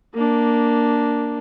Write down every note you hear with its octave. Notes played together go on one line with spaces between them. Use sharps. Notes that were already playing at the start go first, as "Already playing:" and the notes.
A#3 D4